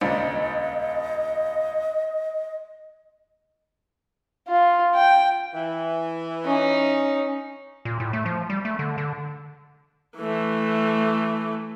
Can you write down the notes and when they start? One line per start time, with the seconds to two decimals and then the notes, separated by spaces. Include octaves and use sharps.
0.01 D#1 C#2 D4 D#5
4.48 F4
4.95 G5
5.53 E3
6.45 C#4 D#4
7.85 A#2
8.00 A2
8.13 A3
8.26 F3
8.50 G3
8.65 A3
8.79 D3
8.98 D3
10.17 E3 A3